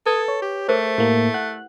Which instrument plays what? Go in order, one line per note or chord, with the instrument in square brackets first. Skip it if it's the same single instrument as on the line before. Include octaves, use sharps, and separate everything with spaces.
[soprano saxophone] A4 [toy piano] B4 [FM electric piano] D#6 G#6
[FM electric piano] C#5
[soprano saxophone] G4
[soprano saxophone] A3 [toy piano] G#4 A#4 C5
[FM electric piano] A2 A#3 [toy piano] E4 G4
[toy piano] F#5 [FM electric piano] F#6